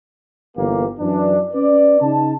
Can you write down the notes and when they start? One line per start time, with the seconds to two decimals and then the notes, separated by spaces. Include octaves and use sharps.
0.56 G1 E3 A#3 G4
0.99 F#2 E3 D4
1.53 C#4 B4 D5
2.01 C#3 D#4 A5